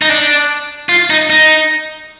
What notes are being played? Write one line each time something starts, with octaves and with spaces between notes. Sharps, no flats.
D#4
D4
F4
D#4
D#4